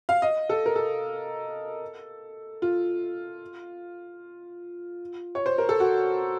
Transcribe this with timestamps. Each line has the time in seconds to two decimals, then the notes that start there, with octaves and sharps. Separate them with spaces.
0.09 F5
0.22 D#5
0.49 A4
0.66 A#4
0.76 A4
2.62 F4
5.35 C#5
5.46 C5
5.58 A#4
5.69 A4
5.80 F#4